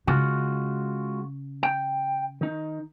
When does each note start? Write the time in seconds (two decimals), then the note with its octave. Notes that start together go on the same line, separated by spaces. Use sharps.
0.07 C#3 G#3 F4 F#4
1.63 G5
2.41 D#3 D#4